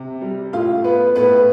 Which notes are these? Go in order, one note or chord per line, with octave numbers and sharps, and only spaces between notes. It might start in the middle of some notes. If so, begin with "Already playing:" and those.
Already playing: C3
G3
A2 F4 F5
B3 B4
A2 B3 B4